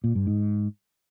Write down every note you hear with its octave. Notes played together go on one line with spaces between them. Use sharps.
A#2
G2
G#2